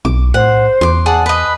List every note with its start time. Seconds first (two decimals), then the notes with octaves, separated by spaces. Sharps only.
0.05 B1 D6
0.34 A2 C5 F#5
0.81 E2 C6 D6
1.06 G#4 D5 F#5 A5
1.26 B4 D#5 B5